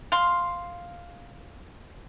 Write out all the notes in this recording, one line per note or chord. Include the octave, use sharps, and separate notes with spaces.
F5 C6